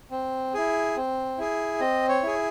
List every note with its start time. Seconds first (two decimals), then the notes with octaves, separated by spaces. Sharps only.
0.11 C4
0.54 E4 G#4
0.96 C4
1.38 E4 G#4
1.80 C4 D#5
2.09 C#5
2.23 E4 G#4